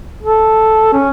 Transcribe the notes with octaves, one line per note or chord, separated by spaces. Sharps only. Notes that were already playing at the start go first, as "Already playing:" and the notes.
A4
C#4